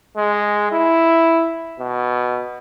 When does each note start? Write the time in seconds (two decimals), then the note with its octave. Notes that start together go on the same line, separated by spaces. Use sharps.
0.17 G#3
0.72 E4
1.79 B2